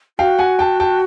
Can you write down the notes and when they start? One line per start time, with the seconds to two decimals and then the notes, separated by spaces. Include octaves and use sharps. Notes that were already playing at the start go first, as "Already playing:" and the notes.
0.19 F#4 F5 G5
0.39 F#5 G#5
0.59 G5 A5
0.80 G5 A5